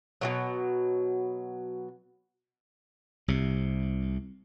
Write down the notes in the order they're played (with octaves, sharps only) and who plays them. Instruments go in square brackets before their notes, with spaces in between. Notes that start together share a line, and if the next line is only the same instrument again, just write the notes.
[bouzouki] B2 D#3 F#3
[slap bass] C2 C3